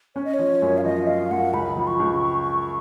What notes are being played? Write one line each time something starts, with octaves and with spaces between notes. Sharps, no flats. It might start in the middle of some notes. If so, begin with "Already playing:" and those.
C#4 C#5
D#5
C#5
F3
F#2
F5
F3 D#5
F3 F5
F#2 F#5
C#2 B5
F3
C#6
C#2